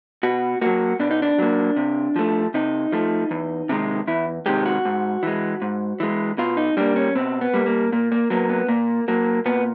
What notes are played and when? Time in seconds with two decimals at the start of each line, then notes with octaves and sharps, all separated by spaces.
0.23 B2 F#4
0.61 F#3 A#3 F#4
1.00 B2 D4
1.11 D#4
1.22 D4
1.38 F#3 A#3
1.76 C3
2.16 F3 A3
2.54 C3 D#4
2.92 F3 A3
3.31 E2
3.69 C3 D#3 G#3
4.07 E2 E4
4.46 C3 D#3 G#3 G4
4.66 F#4
4.85 G#2
5.23 E3 G#3
5.62 G#2
6.00 E3 G#3
6.38 B2 F4
6.57 D#4
6.77 G3 A#3 D4
6.96 C#4
7.15 B2 C4
7.41 B3
7.54 G3 A#3
7.66 A#3
7.92 A#2 A#3
8.12 A#3
8.30 F#3 A#3 B3
8.49 B3
8.68 A#2 A#3
9.08 F#3 A#3
9.46 A#2 B3